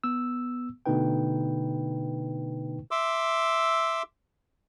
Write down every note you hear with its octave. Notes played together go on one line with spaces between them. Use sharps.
B3 E6
B2 D3 A3 D#4 B4 G5
E5 C6 D6 E6